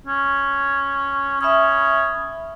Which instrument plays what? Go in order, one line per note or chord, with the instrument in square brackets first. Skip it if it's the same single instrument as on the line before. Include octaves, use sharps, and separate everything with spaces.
[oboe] C#4
[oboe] C#4 [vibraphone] E5 B5 D#6